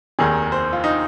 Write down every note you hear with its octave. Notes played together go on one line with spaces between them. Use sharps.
F1 D#2 D#3 G#4
C5
F4
D#4